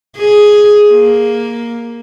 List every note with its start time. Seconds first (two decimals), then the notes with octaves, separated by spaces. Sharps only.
0.17 G#4
0.92 A#3